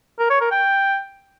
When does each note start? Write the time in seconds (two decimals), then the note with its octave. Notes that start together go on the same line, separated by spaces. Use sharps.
0.19 A#4
0.30 C#5
0.41 A#4
0.51 G5